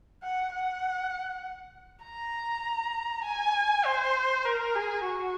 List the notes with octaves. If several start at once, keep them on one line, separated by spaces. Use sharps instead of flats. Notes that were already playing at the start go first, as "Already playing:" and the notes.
F#5
F#5
A#5
G#5
C5
A#4
G#4
F#4